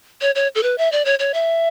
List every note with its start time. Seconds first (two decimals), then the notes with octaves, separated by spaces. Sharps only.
0.21 C#5
0.35 C#5
0.55 A4
0.63 B4
0.78 E5
0.92 D5
1.05 C#5
1.19 C#5
1.34 E5